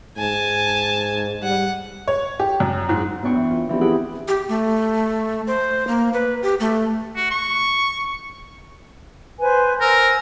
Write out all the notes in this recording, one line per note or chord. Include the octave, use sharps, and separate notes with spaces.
G#2 G#5 A5
G3 F#5
C#5
G4
F#2
G#2
F#2 B3 C#4 D4 G5 C#6
E3
F4
E3 F3 B3 C4 D4 G4
E4 G4 G#4 F#5 G5 B5
G4
A3
C5
A#3
B4
G4
A3
F#4
C#6
B4 C5 G#5
A#4 C5 G#5 E6